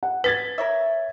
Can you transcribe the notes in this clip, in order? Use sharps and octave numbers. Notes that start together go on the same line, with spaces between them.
F#5
B4 G#6 A6 B6
A#4 C#5 E5